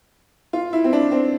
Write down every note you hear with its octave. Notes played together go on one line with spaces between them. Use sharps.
F4
E4
C4
D4
C4